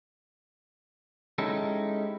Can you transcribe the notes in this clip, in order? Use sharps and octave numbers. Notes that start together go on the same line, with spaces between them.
G#3 C#4 D#4 E4 G4 A4